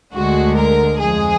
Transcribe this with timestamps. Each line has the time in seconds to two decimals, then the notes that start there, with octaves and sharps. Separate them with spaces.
0.13 D2 D3 G#3 F#4
0.56 A#4
1.00 F2 F3 G#3 G#4